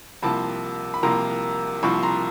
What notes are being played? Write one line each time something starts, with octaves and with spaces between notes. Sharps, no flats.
C2 C3 F3 A#3 A5 B5
B5
C2 C3 F3 A#3 A#5 C6
C2 C3 F3 A#3 B5 C#6
A#5 C6